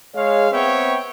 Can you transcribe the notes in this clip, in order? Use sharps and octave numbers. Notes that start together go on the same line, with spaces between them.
G#3 C#5 F5
B3 C4 C#5 E5 G5